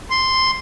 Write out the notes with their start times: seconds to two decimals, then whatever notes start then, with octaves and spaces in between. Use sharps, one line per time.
0.10 C6